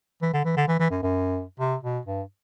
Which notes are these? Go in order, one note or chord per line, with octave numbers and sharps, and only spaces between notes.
E3
D3
E3
D3
E3
E3
F#2
F#2
C3
B2
G2